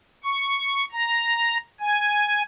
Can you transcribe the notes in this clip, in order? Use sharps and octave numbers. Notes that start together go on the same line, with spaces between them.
C#6
A#5
G#5